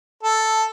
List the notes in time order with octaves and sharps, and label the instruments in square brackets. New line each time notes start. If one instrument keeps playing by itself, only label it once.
[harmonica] A4